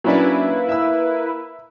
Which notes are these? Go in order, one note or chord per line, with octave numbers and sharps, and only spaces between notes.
F#3 A#3 C#4 D4 E4 B4
E5 E6